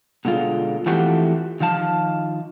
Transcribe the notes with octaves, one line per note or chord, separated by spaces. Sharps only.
B2 D3 G#3 F4
E3 F3 A3 C4 F#4 G4
D#3 F3 F5 A5